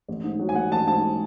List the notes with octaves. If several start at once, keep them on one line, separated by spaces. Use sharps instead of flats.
A1
G#2
F#3
G#5
A1 F#5
A1 A5
G#2 A5